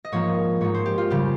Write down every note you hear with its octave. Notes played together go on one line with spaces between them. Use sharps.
D#5
G#2 F3 A#3 D#4 C#5
G#2 F3 A#3 D#4 C#5
C5
G4
F4
F2 C#3 G3 G4